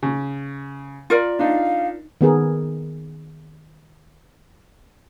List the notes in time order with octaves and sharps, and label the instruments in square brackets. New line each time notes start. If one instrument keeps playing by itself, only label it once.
[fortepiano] C#3
[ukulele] F4 A#4 D5
[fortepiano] D4 D#4 [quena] F5
[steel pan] D#3 B3 G#4 A#4